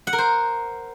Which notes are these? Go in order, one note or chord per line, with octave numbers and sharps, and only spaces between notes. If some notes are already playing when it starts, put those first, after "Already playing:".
F#5
A#4
C5